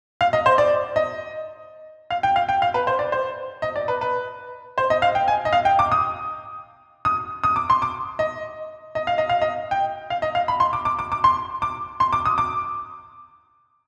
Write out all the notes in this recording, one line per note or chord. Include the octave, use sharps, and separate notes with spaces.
F5
D#5
C5
D5
D#5
F5
G5
F5
G5
F5
B4
C5
D5
C5
D#5
D5
B4
B4
C5
D#5
F5
G5
G#5
D#5
F5
G5
D6
D#6
D#6
D#6
D6
C6
D6
D#5
D#5
F5
D#5
F5
D#5
G5
F5
D#5
F5
B5
C6
D6
D6
D6
D6
C6
D6
C6
D6
D#6
D6